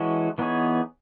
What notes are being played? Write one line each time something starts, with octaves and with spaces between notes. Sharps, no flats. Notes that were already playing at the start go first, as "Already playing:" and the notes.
Already playing: E3 G#3 C#4 F#4 A4
E3 B3 D#4 G#4 C#5